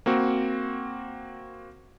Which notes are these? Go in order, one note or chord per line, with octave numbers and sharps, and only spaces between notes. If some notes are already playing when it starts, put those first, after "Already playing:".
A#3 C4 F#4